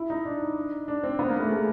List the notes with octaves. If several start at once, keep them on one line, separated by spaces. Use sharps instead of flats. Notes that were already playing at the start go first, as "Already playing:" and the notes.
Already playing: E4
D#4
D4
D4
C4
B3
A#3
A3
G#3